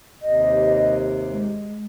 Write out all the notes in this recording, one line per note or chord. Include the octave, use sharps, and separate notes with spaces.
D#2 C3 D#5
G#3